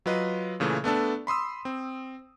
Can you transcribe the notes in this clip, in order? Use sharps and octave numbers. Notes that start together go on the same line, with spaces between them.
F#3 F4 B4 D#5
A#2 C#3 E3 A3
A3 B3 D4 A4
B5 C6 D#6 E6
C4